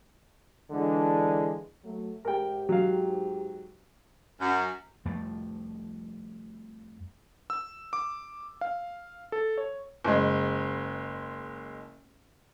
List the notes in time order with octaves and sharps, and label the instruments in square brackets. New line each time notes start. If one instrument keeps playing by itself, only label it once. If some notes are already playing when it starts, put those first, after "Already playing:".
[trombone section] D3 E3 G#3 D4
[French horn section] F#3 A3
[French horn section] G#2 G4 [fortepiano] A#4 G5
[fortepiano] F#3 F5
[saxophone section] F#2
[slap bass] F2 F3 G3 A3
[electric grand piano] E6
D6
F5
A4
C#5
[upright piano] F#1 G#3